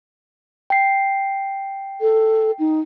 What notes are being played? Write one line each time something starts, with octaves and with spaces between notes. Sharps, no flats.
G5 C7
A4
D#4